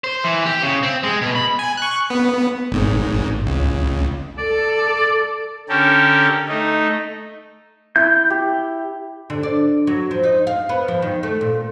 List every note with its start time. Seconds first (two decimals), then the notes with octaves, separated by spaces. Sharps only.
0.04 C5
0.24 E3
0.46 G4
0.62 C#3
0.83 C4
1.03 G#3
1.22 B2
1.35 B5
1.59 G#5
1.77 C#6 F#6
2.10 B3
2.72 G#1 G#2
3.46 C#2
4.38 A4 D5
5.69 D3 C#4 G4 A4 A#4
6.48 A3 D#4
7.96 E4 G6
8.30 G4
9.30 D3
9.43 D5
9.87 F#3
10.11 F3
10.23 D#4
10.47 F5
10.69 B3
10.88 F3
11.02 D#3
11.23 A3
11.41 A#2